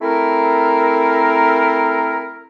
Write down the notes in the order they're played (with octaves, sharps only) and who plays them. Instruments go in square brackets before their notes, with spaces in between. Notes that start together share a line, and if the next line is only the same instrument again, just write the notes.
[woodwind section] A3 C4 E4 A#4